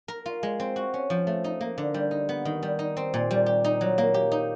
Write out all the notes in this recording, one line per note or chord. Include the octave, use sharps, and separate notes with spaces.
A#4
F4
G#3
C4
F#4
C#4
F3
A3
D#4
A#3
D3
G3
D#4
B3
D#3
G3
D#4
C4
A#2
G3
G4
D#4
F#3
A#3
G4
D#4